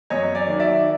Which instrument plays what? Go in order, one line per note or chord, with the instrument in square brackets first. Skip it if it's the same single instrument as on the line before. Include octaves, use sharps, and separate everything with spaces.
[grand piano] F#2 C#5 D#5
D5
D#3 F#3
D5 E5